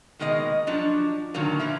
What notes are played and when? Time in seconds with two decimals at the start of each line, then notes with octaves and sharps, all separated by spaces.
0.19 B2 D#3 G#3 A#3 D#5
0.67 F3 F#3 D4
1.34 A#2 D3 D#3 F#3 A#3
1.59 E3 F3 E4